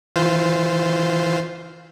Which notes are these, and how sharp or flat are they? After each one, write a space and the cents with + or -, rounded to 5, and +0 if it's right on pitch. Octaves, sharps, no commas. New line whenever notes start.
E3 -5 F4 +0 C5 -10